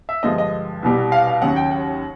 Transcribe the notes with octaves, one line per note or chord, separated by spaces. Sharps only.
E5
G2 D3 F3 G#3 D#5
D#5
C2 B2 G3
F5
F5
D#2 C#3 F#3 F#5
G5
F#5